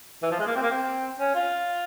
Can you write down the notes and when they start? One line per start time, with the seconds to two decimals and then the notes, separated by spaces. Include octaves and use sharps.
0.23 E3
0.31 F3
0.40 G#3
0.47 A#3
0.56 C4
0.62 A#3
0.71 C4
1.20 C#4
1.35 F4